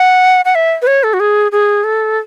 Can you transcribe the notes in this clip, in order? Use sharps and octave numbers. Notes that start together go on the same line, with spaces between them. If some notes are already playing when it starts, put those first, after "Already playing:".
Already playing: F#5
F#5
E5
B4
C#5
A4
F#4
G#4
G#4
A4